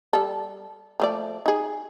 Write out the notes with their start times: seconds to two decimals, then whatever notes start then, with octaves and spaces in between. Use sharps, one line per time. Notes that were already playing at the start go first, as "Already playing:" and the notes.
0.13 G3 A4
1.00 F3 A3 D5
1.46 D#4 G#4